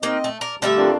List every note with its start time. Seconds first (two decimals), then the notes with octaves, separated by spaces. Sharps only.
0.03 A#3 C4 D#4 D#5
0.24 A3
0.41 A#4 D5
0.62 D3 G3 A3 G4 E5
0.77 F2 A#3 D4